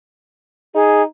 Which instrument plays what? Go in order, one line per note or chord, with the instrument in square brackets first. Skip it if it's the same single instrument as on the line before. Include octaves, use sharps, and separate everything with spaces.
[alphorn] D#4 [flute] G#4